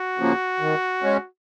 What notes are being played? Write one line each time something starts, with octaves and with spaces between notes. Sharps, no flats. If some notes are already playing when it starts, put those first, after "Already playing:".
Already playing: F#4
C#3 F3 A#3
D#3
G#3 C#4